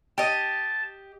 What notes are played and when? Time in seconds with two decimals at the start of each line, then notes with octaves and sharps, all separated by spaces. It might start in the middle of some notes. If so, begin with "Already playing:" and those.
0.18 G4 D#5 A5